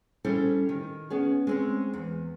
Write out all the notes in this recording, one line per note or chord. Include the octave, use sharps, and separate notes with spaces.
G3 C#4 E4 A4 C5
D#3
B3 C#4 G#4
G#3 C4 C#4
E2